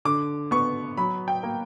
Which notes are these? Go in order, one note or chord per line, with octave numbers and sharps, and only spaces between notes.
D3 D6
B3 C#6
F#3 B5
G5
A#3